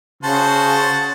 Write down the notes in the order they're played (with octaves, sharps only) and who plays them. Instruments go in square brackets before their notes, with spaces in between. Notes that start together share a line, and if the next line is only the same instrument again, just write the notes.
[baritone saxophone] C#3 [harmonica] F#4 C5 [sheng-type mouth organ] A5